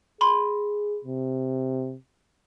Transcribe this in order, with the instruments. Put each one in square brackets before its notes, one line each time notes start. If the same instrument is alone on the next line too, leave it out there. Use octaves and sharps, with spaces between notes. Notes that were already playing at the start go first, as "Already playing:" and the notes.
[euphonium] G#4 [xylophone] B5 C6
[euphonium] C3